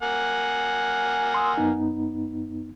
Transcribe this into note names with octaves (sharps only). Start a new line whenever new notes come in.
A#3 F#5 G#5
C6 D#6 E6
F#2 B3 D#4